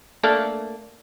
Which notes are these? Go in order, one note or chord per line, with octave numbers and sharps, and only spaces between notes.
A3 A#3 D4